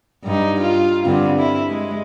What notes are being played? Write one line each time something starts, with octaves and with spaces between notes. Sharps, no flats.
G2 D#4
F4
G2 D3 C4
E4
G#3